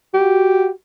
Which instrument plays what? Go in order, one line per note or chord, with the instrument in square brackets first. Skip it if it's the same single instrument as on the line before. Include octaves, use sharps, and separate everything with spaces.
[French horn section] F#4 [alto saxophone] G4